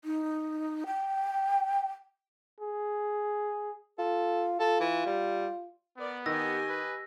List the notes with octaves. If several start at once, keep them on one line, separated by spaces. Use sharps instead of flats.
D#4
G5
G#4
F4 A4
F4 A4
E3
G3
B3 A#4 D5
D#3 G4 D#5 G#5 E6 A#6
B4